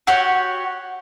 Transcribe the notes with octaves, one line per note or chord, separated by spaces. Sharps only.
F#4 G4 C#5